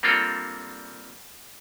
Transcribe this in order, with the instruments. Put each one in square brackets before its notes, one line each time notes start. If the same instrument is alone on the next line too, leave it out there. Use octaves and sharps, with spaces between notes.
[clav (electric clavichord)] G3 A#3 C4 D4 F4 A4